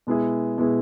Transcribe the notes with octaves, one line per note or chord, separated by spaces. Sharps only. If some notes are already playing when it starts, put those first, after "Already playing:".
B2 G#3 B3 E4 G#4
B2 G#3 B3 E4 G#4